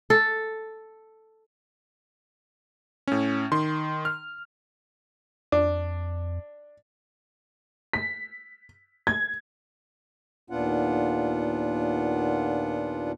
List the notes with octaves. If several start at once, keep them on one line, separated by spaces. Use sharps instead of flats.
A4
A2 C#4
D#3 C6
F6
F2 D4
B6
G#6
D#2 A#2 B3 D4 F4 F#5